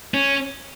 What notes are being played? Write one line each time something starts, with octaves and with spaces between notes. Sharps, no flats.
C#4